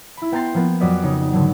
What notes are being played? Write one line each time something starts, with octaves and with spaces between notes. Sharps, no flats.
E4 B5
B3 G5 A#5 C6 A6 C7
F3 A#3 B3
F2 F#3 F#4 D5 D#5 B6
C#3 D#4
G#1 D3 F#3